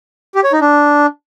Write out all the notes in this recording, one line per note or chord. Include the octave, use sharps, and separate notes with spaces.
G4
C#5
D#4
D4